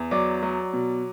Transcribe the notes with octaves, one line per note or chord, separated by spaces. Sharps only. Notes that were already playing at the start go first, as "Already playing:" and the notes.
Already playing: E2
F#3 D5 D6
F#3
B2